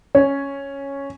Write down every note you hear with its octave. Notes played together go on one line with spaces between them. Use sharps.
C#4